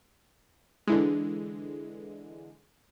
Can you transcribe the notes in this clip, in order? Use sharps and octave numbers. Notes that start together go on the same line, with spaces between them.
D3 E3 G#3